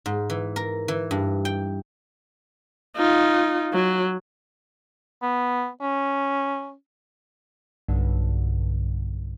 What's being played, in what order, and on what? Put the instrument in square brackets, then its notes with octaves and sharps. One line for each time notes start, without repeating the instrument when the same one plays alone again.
[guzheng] G#2
E3
A#4
E3
G2
G5
[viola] D#4 F4
F#3
[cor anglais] B3
C#4
[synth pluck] B1 G2 D3